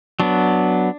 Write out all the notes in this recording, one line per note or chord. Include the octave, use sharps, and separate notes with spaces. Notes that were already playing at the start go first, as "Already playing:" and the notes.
F#3 B3 D4